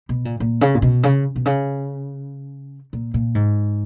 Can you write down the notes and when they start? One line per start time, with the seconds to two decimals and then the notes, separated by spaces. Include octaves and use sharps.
0.09 B2
0.25 A#2
0.40 A#2
0.61 C#3
0.75 A#2
0.82 B2
1.03 C#3
1.36 B2
1.46 C#3
2.93 A#2
3.14 A#2
3.35 G#2